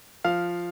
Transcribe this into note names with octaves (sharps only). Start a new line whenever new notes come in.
F3 F5